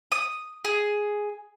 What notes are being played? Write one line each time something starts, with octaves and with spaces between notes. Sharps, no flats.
D#6
G#4